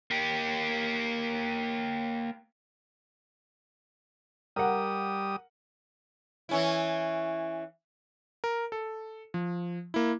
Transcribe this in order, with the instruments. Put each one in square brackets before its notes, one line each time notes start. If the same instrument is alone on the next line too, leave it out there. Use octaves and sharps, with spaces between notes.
[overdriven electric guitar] A#3 G4
[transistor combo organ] G3 D#6 [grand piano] A#4 F#5
[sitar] E3 C#4 E4
[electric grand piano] A#4
A4
F3
A#3 E4